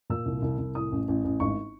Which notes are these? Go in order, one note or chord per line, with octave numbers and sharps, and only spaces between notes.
A#2 E6
C2
C2
C2
A2 D#6
A1
A1
A1
G#1 C#6